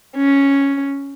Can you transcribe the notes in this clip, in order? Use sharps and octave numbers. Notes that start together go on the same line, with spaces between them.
C#4